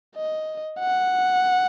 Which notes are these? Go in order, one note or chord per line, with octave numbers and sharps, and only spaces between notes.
D#5
F#5